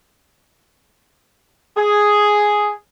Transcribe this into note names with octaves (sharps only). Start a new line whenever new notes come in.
G#4